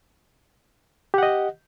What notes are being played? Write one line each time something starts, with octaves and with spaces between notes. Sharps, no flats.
G4 D#5 F#5